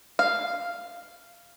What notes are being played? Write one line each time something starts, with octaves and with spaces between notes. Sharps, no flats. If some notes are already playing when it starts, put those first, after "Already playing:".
F5